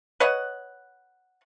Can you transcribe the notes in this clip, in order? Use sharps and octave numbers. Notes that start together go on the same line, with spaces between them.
B4 C#5 D#5 F#5